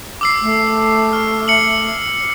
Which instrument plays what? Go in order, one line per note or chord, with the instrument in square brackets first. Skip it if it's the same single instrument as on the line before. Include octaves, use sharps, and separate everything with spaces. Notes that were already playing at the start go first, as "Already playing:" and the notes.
[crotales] D6 E6 C7
[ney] A3
[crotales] F6
C#7 F#7